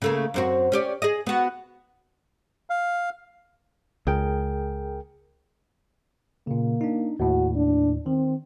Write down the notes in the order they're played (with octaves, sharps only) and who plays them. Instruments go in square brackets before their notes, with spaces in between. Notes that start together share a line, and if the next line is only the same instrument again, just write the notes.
[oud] C#3 A3 A#3
F#2 C4 F#4
C#4 G4 D5
G#4 D#5
B3 F#4
[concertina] F5
[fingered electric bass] C#2 [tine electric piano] G#4 A#4 G5
[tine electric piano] A#2 C#3 [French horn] A#3
[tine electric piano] D4 D#4
[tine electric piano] D#2 A2 [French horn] F#4
[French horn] D4
[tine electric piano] D#3 [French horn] C4